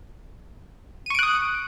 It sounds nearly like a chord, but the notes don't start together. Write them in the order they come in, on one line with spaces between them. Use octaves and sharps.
D#7 C#6 D7 F#6 D#6